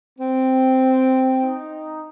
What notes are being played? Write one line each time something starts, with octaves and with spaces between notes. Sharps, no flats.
C4
D#4